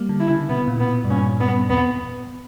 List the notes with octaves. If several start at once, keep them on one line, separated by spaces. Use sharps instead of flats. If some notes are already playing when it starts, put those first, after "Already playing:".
Already playing: G3 A#3
D3
E4
C#3
B2 B3
A#2
B2 B3
G2
A#2 C#4
G2 B3
E2 B3